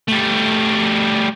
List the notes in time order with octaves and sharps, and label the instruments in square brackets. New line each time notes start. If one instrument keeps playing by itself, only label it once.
[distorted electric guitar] G3 A3